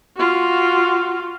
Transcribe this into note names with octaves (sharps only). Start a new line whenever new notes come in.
F4 F#4